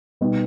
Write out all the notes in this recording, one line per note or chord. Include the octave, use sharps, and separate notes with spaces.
B2 G3 B3 D#4